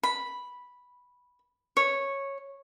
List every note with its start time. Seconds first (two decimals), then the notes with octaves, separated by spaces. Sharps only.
0.03 B5
1.77 C#5